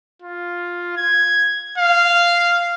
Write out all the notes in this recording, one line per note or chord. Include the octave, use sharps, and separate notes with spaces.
F4
G#6
F5